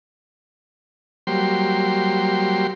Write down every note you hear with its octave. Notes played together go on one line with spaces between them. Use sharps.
F#3 G3 A#3 G4 C5 C6